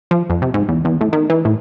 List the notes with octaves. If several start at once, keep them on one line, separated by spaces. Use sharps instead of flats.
F3
F2
C3
G#2
E2
E2
A2
D#3
E3
A2